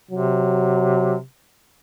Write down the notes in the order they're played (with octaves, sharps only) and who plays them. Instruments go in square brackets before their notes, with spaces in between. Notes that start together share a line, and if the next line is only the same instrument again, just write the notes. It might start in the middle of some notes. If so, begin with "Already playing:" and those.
[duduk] C3 [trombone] F#3